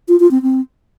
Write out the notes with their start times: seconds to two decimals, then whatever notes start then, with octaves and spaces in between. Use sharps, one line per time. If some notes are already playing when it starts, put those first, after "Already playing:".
0.08 F4
0.20 F4
0.31 C4
0.42 C4